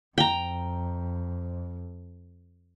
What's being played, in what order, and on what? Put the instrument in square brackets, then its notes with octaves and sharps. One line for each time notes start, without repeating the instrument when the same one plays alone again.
[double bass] F2 [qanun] G5 A#5